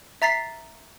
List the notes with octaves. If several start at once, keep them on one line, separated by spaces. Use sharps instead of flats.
E5 A#5 A6 B6 C7